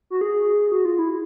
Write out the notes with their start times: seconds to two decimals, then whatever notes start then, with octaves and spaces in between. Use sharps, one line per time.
0.10 F#4
0.21 G#4
0.72 F#4
0.85 F4
0.99 E4